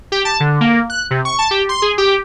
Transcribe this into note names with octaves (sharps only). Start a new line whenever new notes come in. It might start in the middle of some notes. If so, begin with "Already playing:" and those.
G4
A5
D3
A#3
F#6
C3
C#6
A5
G4
C6
G#4
G4